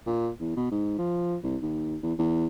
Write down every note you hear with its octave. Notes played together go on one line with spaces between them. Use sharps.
A#2
E2
B2
G#2
F3
C2
D#2
E2
E2